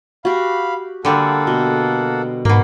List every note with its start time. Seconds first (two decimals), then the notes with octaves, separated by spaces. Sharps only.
0.25 F#4 G4 F5 B5
1.05 D3 G3 A#3 A4 F#5
1.47 B2
2.45 G#2 B2 A#3